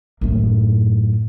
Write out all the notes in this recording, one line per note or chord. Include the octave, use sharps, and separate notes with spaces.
F#2 A2